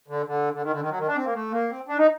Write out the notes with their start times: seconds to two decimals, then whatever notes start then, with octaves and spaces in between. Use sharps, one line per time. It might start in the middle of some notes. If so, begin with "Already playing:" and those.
0.08 D3
0.26 D3
0.53 D3
0.62 D#3
0.71 D3
0.80 D#3
0.89 F#3
0.98 D#3
1.07 D4
1.16 C4
1.25 A#3
1.34 A3
1.52 A#3
1.70 C4
1.88 D4
1.98 D#4